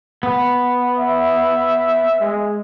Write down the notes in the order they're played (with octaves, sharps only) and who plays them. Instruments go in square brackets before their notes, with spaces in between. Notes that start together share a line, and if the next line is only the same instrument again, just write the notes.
[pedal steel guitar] B3
[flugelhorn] E5
G#3